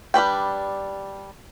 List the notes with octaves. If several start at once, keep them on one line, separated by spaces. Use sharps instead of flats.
G3 D4 B4 G5